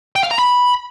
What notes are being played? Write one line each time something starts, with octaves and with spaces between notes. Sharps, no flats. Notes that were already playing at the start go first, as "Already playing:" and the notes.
G5
F5
A#5
B5